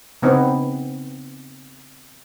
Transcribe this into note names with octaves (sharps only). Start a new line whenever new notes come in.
C#3 B3 C4 D#4